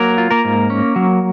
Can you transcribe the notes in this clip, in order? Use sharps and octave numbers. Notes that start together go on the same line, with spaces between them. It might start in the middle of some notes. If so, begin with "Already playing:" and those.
Already playing: F#3 A#3 A#4
F4
A#3 A#4
G#2
C#4
F#3